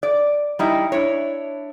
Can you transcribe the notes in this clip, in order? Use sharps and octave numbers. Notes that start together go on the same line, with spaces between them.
D5
G3 D#4 E4
D4 E4 C#5